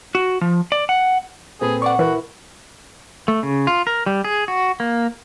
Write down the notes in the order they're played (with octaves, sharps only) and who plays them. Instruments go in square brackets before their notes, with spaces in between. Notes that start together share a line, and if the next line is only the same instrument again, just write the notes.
[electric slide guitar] F#4
F3
D5
F#5
[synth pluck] A#2 [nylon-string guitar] C4 A4 B4 [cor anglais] G#4
[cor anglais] D5 [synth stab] F#5 C#6
[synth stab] E3 [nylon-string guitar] E4 [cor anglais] F#4 [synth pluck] A#4 B4
[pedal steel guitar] A3
C#3
F4
A#4
G3
G#4
F#4
A#3